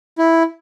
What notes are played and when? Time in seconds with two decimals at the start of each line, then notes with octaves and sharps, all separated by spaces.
0.19 E4